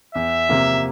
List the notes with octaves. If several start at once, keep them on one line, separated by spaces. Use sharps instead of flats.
E2 E5
C3 F3 A#3 F4